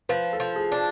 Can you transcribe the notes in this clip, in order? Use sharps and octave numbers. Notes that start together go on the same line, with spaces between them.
F3 B4
A4
F3
G#4
D4